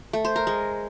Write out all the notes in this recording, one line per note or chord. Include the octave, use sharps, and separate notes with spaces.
A3
C5
A#4
G#3